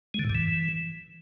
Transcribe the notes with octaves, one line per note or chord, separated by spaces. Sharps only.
G#3
D3
A2
G2
E3